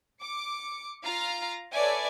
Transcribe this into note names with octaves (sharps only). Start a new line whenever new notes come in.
D6 C#7
F4 F5 A#5
A4 B4 C#5 D5 E5 G#5